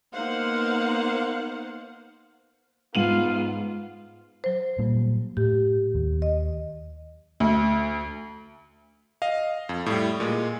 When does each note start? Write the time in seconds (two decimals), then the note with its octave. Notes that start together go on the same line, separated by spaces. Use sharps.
0.12 A#3 B3 D#4 C5 F5 F#5
2.95 G#2 B3 F4 D#7 F#7
4.44 F#3 C5
4.79 A#2 G3
5.37 A2 G4
5.94 D#2
6.22 D#5
7.40 D2
9.22 D#5 F5
9.69 F2
9.86 A2 G3
10.20 A#2 G#3